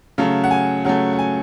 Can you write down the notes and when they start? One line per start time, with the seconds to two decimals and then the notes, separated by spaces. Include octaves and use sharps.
0.18 C#3 F#3 A3 F5
0.44 F#5
0.51 G#5
0.85 C#3 F#3 A3 F#5
1.13 F#5
1.19 G#5